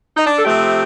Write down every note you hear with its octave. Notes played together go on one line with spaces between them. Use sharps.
D#4
D4
A4
C3 F3 A3 G4